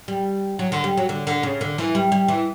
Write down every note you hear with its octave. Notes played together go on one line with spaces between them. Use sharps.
G3
F#3
D3
G3
F#3
D3
D3
C#3
D3
E3
G3
G3
E3